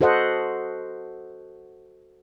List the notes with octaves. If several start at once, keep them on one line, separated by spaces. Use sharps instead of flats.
F#4 A4 C5 D#5 F#5